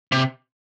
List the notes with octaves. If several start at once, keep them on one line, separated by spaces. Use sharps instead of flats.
C3